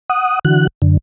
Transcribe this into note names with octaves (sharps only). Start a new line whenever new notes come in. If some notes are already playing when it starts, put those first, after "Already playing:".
F#5 D#6
D3 E3 F#4 F#6
F#2 D3